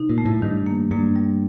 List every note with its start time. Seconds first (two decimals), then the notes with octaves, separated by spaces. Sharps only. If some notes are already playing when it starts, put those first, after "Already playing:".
Already playing: C3 D#4
0.09 A#2
0.18 A3
0.25 A2
0.42 G2 D#3
0.66 A#3
0.91 G2 A#3
1.16 G3